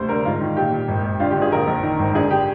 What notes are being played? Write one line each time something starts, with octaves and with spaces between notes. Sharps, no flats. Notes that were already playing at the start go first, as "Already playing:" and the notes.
Already playing: D2 C3 C5
D3 A#4
G#2 F4
D#3
A#2 G4
A#2
G#1
G#1
D3 F4
G4
D3
G#4
A#1 A#4
A#1
D#3
G#1
D3 G#4
D3 G4